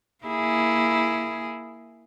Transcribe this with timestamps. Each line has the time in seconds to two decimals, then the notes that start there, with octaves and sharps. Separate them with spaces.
0.25 A#3 E4 G#4